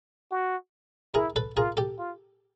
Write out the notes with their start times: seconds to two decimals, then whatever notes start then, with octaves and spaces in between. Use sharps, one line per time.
0.31 F#4
1.14 E4 G#4 A#4
1.36 A4 B4
1.57 F4 G#4 A#4
1.77 G4 A4
1.99 F4